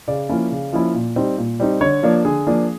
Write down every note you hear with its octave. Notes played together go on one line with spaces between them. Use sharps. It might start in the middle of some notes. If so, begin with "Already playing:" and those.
C#3 D5
F3 A#3 C#4 E4
C#3
F3 A#3 C#4 E4
A#2
G3 C4 D#4
A#2
G3 C4 D#4
D3 C#5
F3 A#3 D4
D3 G#4
F3 A#3 D4